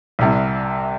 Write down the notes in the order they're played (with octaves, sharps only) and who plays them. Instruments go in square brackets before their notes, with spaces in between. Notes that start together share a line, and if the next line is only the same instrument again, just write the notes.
[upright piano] C2 C3 G3